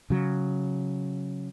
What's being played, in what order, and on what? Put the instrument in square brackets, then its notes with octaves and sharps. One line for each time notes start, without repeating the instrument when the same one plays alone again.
[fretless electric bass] C#3 F#3